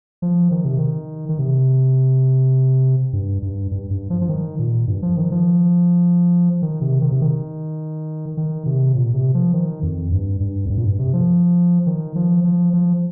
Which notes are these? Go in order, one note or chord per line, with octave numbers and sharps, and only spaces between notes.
F3
D#3
C3
D#3
D#3
C3
G2
G2
G2
G2
F3
F3
D#3
A#2
G2
F3
D#3
F3
D#3
C3
D#3
C3
D#3
D#3
C3
A#2
C3
F3
D#3
F2
G2
G2
F2
G2
A#2
G2
C3
F3
D#3
F3
F3
F3